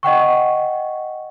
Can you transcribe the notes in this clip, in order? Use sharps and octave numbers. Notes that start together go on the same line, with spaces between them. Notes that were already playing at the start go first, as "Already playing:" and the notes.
D#5 F#5 G5 C#6